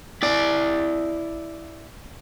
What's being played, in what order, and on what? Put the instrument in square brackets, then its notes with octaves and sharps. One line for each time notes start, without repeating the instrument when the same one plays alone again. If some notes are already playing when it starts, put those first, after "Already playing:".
[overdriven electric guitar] E4 D5